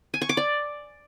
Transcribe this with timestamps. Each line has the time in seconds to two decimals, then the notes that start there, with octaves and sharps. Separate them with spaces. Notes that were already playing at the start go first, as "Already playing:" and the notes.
0.14 G#5
0.21 C#6
0.29 D6
0.37 D5